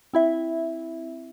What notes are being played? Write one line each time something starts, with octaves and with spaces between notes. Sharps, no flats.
C4 E4 E5